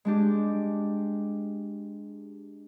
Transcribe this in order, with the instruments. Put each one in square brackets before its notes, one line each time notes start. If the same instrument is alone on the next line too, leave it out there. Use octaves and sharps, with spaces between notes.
[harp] G#3 D4 G4